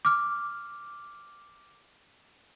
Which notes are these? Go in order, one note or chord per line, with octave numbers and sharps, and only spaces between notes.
D6 F6